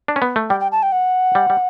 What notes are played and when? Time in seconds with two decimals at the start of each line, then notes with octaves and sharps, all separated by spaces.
0.08 D4
0.16 C#4
0.22 B3
0.36 A3
0.50 G3 G5
0.60 G5
0.72 A5
0.83 G5
0.92 F#5
1.35 G3
1.50 G3